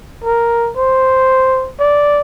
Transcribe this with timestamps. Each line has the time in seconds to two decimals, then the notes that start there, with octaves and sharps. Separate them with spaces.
0.24 A#4
0.77 C5
1.79 D5